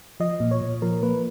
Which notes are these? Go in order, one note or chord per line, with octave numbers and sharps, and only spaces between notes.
F3 D#5
A#2
C#5
A#2
F3 A#4
A#3 B4